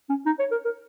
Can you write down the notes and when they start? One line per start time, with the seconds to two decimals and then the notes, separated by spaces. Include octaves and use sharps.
0.10 C#4
0.26 D#4
0.39 C#5
0.51 A#4
0.65 A#4